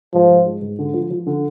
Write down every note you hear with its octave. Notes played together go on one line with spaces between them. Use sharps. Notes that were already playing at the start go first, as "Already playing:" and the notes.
G#2 F3
G#2
G#3
G#2
D3
F3
F3
D3